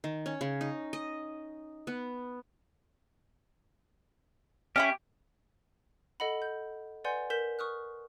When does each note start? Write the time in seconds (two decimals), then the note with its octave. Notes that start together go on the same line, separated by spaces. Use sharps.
0.04 D#3
0.26 C#4
0.41 C#3
0.61 D#4
0.93 D#5
1.87 B3
4.76 C#4 D#4 E4 G4
6.20 A4 D#5 F#5 B5
6.42 G6
7.04 B4 D5 F#5 G#5 C6 G6
7.30 A#4 G6 B6 E7
7.59 C#6 D#6 F6 F#6